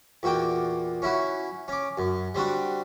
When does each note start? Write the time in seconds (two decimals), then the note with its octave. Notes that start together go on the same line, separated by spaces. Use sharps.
0.23 E2 A#2 F#4 G5 D6
1.02 C#4 E4 F#4
1.68 C#4 D6
1.98 F#2
2.34 G3 C4 D4 F#4